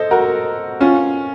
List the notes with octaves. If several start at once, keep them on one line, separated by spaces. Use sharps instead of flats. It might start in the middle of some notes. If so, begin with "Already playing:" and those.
Already playing: A4 C5 D#5
F#4 A#4
C#4 F4